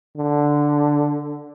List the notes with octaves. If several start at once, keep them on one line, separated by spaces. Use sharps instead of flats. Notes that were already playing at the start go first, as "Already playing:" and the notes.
D3